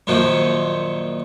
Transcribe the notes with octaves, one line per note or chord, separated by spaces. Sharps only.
F#2 A#2 D#3 F3